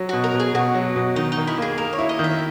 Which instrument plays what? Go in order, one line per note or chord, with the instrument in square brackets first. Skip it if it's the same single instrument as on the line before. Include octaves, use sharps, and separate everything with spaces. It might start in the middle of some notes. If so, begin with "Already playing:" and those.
Already playing: [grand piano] F#3
[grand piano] B2 [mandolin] F#4
[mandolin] A#4
[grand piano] B2
[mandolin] G#4
[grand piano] B2 [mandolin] F#4
[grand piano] F#3
B2
[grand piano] D#3 [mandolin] D#4
[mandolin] D#4
[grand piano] D#3
[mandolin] E4
[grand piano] A#3 [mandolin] G#4
[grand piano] A#3 [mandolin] A#4
[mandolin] C#5
[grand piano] E4
[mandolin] D#5
[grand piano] D#3
[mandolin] E5